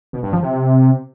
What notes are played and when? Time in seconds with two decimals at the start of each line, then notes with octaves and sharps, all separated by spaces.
0.13 B2
0.23 G2
0.33 F3
0.43 C3